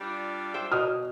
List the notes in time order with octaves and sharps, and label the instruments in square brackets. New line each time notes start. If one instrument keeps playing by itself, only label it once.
[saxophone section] G3 D4 F4
[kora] C5 E5 G5
[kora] B2 [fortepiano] D#6 F6